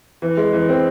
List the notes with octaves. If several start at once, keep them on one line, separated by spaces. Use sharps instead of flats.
E3
G#3
E3
C4